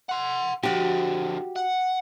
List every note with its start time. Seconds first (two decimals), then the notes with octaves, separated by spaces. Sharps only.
0.09 F#5 C6
0.63 D3 F3 F#4 G4
1.56 F#5